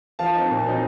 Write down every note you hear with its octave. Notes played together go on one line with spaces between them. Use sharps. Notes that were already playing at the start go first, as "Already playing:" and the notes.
F3 F5 A5
C4 D#4
A#2
F#3 C4 D#4